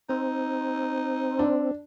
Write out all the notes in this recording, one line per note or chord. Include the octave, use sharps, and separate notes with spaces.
C4 D#4
D4